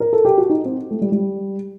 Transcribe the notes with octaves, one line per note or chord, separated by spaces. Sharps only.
A#4
A4
G4
F#4
D#4
C4
A3
G3
G3